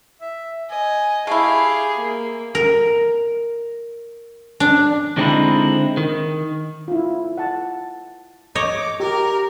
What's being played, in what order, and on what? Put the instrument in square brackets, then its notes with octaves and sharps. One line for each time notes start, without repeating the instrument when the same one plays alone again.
[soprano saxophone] E5
[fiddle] D#5 [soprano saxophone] G#5
[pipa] A3 E4 [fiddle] G4 F5 [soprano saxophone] G#4
[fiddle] A#3
[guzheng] A#4
D4
[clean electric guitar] D3 G#3 C4 C#4 D#4 E4
D#3
[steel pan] E4 F4
F#5 A5
[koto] C#5 D#5 [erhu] D6
[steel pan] G4 [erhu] A#4